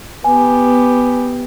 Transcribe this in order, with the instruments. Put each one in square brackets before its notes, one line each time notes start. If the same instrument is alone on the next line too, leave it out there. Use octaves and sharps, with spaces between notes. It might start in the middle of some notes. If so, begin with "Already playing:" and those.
[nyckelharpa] B3 G4 [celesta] G#5